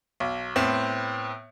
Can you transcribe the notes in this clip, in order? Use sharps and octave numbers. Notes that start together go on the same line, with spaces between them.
B1
A2 B3 C4